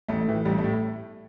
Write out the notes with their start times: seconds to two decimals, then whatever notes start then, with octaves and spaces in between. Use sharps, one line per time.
0.08 A1 A3
0.27 A2 E3
0.45 A1 G3
0.58 A3
0.64 A2